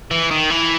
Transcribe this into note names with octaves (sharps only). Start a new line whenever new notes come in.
E3
D#3
E3